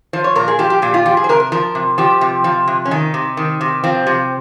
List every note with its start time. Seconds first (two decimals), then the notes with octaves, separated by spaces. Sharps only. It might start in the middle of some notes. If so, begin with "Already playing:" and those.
0.13 F3 C5
0.24 C#5
0.35 A#2 A#4
0.48 G#4
0.59 F3 G4
0.70 G4
0.82 A#2 G4
0.94 F4
1.06 F3 G4
1.17 G#4
1.24 C5
1.29 C3 A#4
1.40 A#4
1.52 F3 A#4
1.75 C3
1.98 F3 G4
2.21 C3
2.44 F3
2.67 C3
2.85 C#4
2.91 D#3 D#4
3.14 C3
3.37 D#3
3.61 C3
3.84 F3 C4
4.07 C3